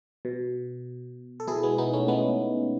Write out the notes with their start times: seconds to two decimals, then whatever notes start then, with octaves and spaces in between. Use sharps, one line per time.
0.25 B2
1.40 A4
1.47 B2 E4 G#4
1.63 G#3 B3
1.78 B3 D#4
1.93 A3 C#4
2.08 G#3 B3